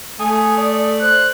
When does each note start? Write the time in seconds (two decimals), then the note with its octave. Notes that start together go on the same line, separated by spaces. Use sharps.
0.20 A3 G#5 D#6
0.57 D5
1.01 C5 F#6